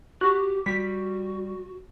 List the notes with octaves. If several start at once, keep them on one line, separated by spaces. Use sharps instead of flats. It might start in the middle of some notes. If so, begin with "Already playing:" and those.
F#4 G4
G3 F#4 B6